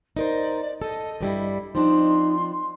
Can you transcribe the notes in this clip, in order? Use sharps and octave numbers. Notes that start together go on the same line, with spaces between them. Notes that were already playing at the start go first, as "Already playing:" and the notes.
D#4 A#4 C5 D5
A4 D#5
G2 G3 E4
F3 C4 D4 D#4 C6